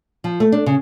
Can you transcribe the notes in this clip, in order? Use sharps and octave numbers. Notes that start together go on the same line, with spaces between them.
F3
A3
D4
C#3